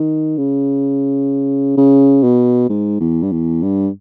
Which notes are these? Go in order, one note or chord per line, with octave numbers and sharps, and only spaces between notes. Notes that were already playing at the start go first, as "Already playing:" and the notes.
Already playing: D#3
C#3
C#3
B2
G#2
E2
G2
E2
G2